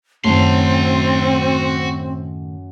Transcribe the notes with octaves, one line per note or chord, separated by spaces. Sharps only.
F#2 A2 D#3 C4 F#4 C6